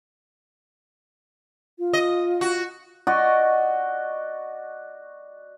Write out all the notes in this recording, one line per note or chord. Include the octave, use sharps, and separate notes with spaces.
F4
D#5
F#4
F#4 D5 D#5 C#6